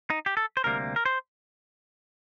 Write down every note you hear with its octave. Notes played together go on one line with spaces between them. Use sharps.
D#4
G4
A4
C5
D2 C3 G3 A#3 A#4
A#4
C5